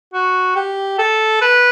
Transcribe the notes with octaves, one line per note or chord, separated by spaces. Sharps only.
F#4
G4
A4
B4